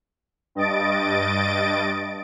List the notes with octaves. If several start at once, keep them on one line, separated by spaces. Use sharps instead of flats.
G2 D#5 A6 D7